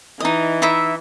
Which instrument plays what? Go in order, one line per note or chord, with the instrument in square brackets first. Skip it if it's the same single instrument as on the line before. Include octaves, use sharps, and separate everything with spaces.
[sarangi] E3 [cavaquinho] D#4 D#5
[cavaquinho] D#4 E4 E5